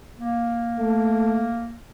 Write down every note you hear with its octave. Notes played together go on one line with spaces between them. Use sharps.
A#3
A3